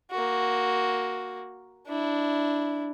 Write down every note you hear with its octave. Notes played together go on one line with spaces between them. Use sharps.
A#3 F#4
D4 E4